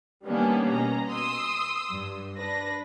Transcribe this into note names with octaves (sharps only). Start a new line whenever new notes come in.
D#3 G3 A#3 B3 C#4 D4
B2 C#4 A#5
C6 D#6 E6
G2
D4 B4 A#6